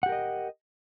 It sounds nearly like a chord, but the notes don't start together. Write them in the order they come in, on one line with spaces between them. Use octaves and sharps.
F#5 G4 A#4 D#5